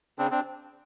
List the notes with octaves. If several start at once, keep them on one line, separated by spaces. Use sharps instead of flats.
C#3 C4 D4
C4 D4